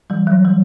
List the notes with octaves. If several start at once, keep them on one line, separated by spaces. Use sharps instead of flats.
E3 G3
F#3
E3 G3